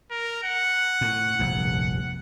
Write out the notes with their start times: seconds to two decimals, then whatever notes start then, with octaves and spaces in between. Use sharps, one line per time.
0.11 A#4
0.44 F#5
1.01 A2
1.39 F1 A#1 G2